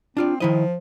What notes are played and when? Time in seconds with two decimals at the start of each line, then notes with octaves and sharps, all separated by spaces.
0.17 C4 D4 F4 D5
0.40 D#3 F3 E4 D#5